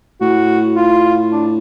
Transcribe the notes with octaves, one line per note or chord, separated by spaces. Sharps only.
A2 F#4
F4
D4